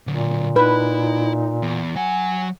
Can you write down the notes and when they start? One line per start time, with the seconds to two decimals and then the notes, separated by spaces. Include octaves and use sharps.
0.07 A#2 D3 F#3
0.56 D#4 E4 B4
1.62 E2
1.96 F#3 F#5 G#5